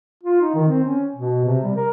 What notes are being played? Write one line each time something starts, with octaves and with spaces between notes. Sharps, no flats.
F4
D#4
D#3
C4
C#4
B2
C3
G3
A#4